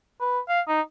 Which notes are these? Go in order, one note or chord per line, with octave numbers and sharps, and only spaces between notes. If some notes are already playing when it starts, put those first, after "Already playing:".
B4
F5
D#4